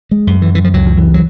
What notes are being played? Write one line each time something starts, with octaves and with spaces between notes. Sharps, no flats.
G#3
F#2
E3
E3
F3
C#2 F#3
F3
E3
F#3